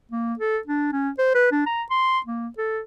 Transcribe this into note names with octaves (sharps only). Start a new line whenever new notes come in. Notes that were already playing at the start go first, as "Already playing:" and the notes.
A#3
A4
D4
C#4
C5
B4
D4
A#5
C6
A#3
A4